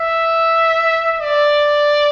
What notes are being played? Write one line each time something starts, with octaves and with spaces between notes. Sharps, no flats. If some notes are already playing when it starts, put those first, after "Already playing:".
Already playing: E5
D5